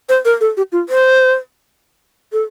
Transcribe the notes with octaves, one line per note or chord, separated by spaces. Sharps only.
C5
A#4
A4
G4
F4
C5
A4